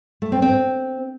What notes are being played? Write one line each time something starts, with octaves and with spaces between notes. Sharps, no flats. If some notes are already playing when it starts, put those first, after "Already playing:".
A3
C4
C4